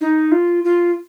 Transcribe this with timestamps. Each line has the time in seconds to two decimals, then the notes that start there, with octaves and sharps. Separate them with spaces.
0.01 D#4
0.32 F4
0.64 F4